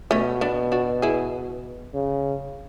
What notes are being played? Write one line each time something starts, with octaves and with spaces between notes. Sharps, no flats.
B2 A3 C#4
B3 D4
D4 F#4
E4 G#4
C#3